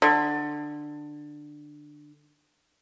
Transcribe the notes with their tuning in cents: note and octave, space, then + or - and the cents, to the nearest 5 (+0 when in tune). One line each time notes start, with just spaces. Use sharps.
D3 +15